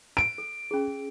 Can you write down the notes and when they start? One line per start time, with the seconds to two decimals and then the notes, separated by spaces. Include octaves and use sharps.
0.17 D7
0.38 A4
0.71 C#4 G#4